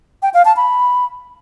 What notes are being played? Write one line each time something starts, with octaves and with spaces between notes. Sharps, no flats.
G5
F5
A5
B5